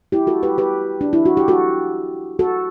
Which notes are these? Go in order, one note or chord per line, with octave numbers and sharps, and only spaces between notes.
E4 G4
F#4 A4
G4 B4
G4 B4
D4
E4
F#4
G4
F#4 A4
F#4 A4